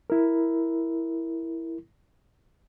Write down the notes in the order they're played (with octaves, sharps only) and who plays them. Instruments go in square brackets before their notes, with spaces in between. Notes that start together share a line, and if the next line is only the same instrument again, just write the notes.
[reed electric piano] E4 A#4